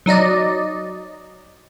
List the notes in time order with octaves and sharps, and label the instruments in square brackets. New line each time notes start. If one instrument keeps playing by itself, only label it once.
[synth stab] F#3 D#4 D5 D#5